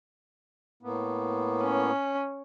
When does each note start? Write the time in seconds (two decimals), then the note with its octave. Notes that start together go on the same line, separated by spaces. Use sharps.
0.83 A2 A#3 B3
1.62 C#4